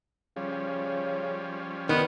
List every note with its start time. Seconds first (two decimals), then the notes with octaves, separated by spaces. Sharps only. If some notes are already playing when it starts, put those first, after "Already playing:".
0.36 C#3 F3 G3 C#4
1.89 G2 D#3 B3 C6 F6